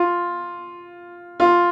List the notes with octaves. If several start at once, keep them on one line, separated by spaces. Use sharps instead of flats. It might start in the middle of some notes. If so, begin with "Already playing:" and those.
Already playing: F4
F4